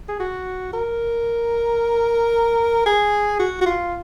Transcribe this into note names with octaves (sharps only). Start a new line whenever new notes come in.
G#4
F#4
A#4
G#4
F#4
F#4
F4